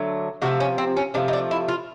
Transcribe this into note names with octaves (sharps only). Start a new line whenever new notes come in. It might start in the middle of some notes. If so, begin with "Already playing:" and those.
Already playing: D3 F#3 A3
C3 F3 A3 F#4
C#4
C4
C#4
C3 F3 A3 D4
D#4
D4
E4
F4